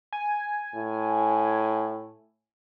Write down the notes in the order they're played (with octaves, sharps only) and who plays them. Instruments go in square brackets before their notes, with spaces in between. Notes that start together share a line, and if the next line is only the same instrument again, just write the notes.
[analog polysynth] G#5
[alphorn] A2